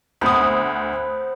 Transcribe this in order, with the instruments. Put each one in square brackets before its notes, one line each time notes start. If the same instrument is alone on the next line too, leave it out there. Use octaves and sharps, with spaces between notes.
[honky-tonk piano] D2 D#6 [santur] B3 C4 F#5